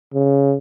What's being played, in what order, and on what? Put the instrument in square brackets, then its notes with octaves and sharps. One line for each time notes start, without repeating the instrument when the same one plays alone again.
[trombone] C#3